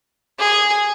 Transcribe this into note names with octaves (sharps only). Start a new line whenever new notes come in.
G#4